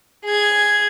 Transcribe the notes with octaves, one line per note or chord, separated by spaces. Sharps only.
G#4 G#6